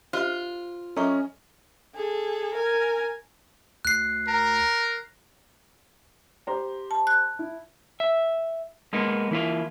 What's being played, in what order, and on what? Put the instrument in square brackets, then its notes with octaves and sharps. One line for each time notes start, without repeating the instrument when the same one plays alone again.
[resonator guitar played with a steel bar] F4 [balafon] G4 D#5 E5 [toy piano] C5
[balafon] F#3 E5 A#5 [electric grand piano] C#4 D#5 [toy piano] A4 C#6
[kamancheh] G#4 A4
A#4 G#5
[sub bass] D2 [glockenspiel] F#6 C7
[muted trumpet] A#4 [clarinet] A#5
[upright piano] G4 C5 A#5
[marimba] A5
F#6
[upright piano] E4
[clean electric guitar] E5
G#3 A#3 B3 D#4
E3 A#3 E4 F4